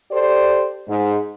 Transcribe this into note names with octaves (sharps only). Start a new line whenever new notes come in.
G4 A4 C5 D5
G#2